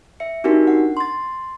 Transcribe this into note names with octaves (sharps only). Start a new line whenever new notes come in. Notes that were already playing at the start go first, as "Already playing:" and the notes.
E5 C#7
C4 D4 D#4 F#4 G4 A#4
F#5
C6 A6